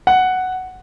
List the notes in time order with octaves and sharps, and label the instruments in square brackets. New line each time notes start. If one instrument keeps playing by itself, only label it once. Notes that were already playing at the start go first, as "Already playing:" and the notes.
[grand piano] F#5